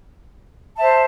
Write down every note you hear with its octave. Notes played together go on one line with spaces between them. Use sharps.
C5 E5 A5